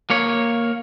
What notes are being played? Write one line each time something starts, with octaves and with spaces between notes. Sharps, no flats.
A#3 C#5